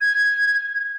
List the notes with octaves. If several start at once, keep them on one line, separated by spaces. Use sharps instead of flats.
G#6